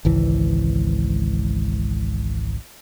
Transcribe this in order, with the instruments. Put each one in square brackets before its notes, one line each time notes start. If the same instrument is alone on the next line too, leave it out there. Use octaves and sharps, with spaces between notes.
[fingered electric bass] G#1 C#2 E3